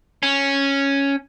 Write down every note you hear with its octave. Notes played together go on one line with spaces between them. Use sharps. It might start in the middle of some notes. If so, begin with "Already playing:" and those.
C#4